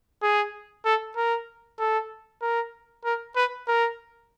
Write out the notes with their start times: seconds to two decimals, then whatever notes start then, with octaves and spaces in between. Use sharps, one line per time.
0.22 G#4
0.85 A4
1.17 A#4
1.79 A4
2.42 A#4
3.05 A#4
3.36 B4
3.68 A#4